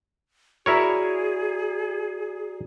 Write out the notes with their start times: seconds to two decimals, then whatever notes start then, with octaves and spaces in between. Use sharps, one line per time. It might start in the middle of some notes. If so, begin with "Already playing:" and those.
0.66 E4 F#4 G#4 A#4 C#5 D5 A#5